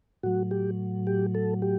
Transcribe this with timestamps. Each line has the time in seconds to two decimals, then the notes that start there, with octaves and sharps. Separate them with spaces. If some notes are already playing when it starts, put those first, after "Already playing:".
0.23 A2 F#3 F#4
0.51 G4
1.07 G4
1.35 A4
1.62 G4